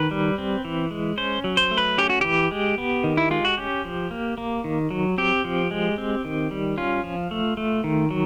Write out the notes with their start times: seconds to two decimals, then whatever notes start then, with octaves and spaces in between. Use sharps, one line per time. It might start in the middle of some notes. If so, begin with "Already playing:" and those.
Already playing: D#3 B4
0.11 G3
0.38 C4
0.65 E3
0.91 G#3
1.17 C#4 C5
1.44 F#3
1.57 C5
1.71 A3
1.78 B4
1.98 C#4 G4
2.10 F#4
2.21 E3 G4
2.51 G#3
2.78 B3
3.04 D#3
3.17 E4
3.31 G#3 F4
3.45 F#4
3.58 C#4 G4
3.85 F3
4.11 A#3
4.38 A#3
4.64 D#3
4.91 F#3
5.18 C4 G4
5.44 F3
5.71 G#3
5.98 C4
6.25 D#3
6.51 G3
6.78 C#4 F4
7.04 F3
7.31 A3
7.57 A3
7.84 D#3
8.11 F#3